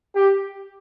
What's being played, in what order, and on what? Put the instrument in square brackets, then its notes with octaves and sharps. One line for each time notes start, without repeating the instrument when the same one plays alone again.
[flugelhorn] G4